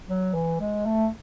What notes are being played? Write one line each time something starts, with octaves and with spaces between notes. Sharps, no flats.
F#3
E3
G#3
A3